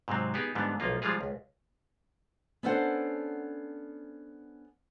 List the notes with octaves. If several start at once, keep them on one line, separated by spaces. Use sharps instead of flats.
G#2 C3 F#3 C4
B3 D#4 G4 G#4
G#2 D3 E3 G3 B3 D4
B1 F3 A#3 F4
F3 G3 G#3 F4 G#4
C#2
B3 C#4 D4 A4 C5 F#5